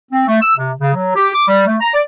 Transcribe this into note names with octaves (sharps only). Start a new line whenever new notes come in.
C4
A3
E6
C3
C#3
F#3
G4
D6
G3
A3
A#5
D5